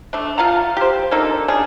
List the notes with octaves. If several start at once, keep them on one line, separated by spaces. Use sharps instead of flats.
A3 D4
F4 F5 F#5 A#5
G4 C5
A#3 D4 D#4 A4
C#3 D4 G#4